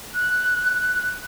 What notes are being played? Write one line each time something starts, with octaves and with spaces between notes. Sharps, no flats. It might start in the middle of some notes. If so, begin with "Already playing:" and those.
F#6